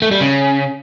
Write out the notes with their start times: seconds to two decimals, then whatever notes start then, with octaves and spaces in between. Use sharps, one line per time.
0.02 A3
0.11 G3
0.21 C#3